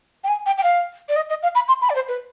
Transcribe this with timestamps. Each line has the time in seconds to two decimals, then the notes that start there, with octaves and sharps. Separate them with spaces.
0.24 G5
0.28 G#5
0.46 G5
0.58 G5
0.63 F5
1.09 D5
1.16 D#5
1.29 D#5
1.43 F5
1.55 B5
1.68 C6
1.81 B5
1.90 D5
1.95 C5
2.08 B4